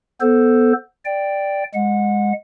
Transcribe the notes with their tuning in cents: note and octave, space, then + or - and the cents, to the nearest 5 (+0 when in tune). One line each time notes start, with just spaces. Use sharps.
B3 +0 A4 +0 C5 +0
D5 +0 G5 +0
G#3 -15 F#5 -25